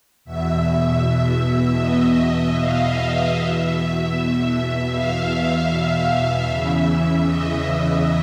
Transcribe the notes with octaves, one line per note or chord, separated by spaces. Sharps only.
E2 B2 E5
D#5
E5
F5
E5
E2 B2 E5
F5
F5
E5
E2 C#3 E3
D#5
E5